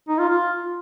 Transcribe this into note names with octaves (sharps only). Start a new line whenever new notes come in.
D#4
F4
F4